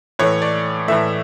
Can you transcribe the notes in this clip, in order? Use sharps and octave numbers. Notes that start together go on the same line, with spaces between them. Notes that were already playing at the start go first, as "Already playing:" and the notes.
A2 E3 A3 C#5
D5
A2 E3 A3 E5